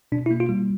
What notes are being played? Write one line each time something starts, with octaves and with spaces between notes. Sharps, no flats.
B2 D4
E4
A#3
F4
G3